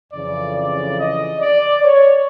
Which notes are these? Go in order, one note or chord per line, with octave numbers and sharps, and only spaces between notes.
F2 C#3 E3 D5
D5
D#5
D5
C#5